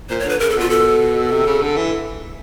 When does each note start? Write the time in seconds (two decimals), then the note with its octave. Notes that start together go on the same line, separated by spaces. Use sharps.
0.09 A#2 C5
0.19 C#5
0.25 D3 B4
0.39 C#3 A#4
0.50 A4
0.55 B2 F4
0.70 A4
1.31 C3
1.46 C#3
1.62 D3
1.76 E3